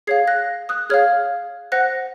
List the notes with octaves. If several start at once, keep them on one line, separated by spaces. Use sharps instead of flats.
G#4 C#5 F5 G#6 C7
F#6 A#6
D#6 F#6
G#4 C#5 F5 F6 G#6
C5 F#5 F#6 A#6